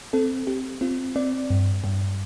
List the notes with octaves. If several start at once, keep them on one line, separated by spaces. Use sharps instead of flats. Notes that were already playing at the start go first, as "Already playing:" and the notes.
C4 A4
C4 G4
C4 F4
C4 D5
G2
G2